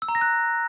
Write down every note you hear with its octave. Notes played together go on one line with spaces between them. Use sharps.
E6
A#5
A#6
F#6